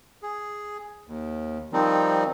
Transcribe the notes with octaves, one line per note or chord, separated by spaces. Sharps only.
G#4
D#2
D#3 F3 G3 C4 D#4